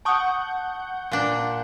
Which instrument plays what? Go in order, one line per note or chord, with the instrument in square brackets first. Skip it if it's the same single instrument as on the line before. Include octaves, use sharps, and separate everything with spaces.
[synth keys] F#5 G6 [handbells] A5 C#6 D#6
[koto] A#2 D4